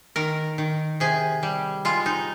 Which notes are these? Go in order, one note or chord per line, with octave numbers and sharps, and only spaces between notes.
D#3 A#4
D#3
C3 G#4
G3
G#3 F4
D#4